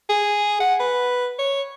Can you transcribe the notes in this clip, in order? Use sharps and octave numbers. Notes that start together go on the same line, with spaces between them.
G#4
F#5
B4
C#5